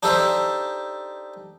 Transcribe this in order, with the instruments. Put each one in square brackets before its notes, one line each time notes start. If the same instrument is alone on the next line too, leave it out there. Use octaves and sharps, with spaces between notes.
[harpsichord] D4 D#4 G4 A4 C5 E5